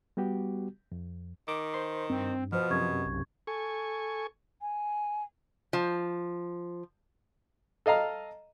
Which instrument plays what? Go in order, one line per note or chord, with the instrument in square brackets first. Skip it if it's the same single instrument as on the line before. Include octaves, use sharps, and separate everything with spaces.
[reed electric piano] G3 B3 F#4 G4
F2
[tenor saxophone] D#3 [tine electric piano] D6
[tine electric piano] C5 C6
[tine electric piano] G2 [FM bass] C4
[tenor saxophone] B2 [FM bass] F3 [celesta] C5 F6
[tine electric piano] F#2 C3 [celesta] C#6 G#6
[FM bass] B1
[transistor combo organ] A4 G#5 C#6
[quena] G#5
[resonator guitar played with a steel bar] F3
[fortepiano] A4 D#5 F5 A#5